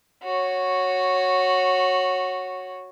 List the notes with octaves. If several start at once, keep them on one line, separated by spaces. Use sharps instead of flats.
F#4 C#5